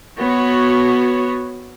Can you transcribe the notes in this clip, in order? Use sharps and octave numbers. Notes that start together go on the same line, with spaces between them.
B3 F#4 C#5